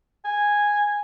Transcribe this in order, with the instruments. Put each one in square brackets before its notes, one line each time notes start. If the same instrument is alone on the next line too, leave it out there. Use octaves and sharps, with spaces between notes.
[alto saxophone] G#5